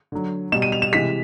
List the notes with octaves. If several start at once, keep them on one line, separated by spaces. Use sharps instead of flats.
D3 F#3
B2 G3 E7
D#7
F7
E7
C3 E3 G#3 B6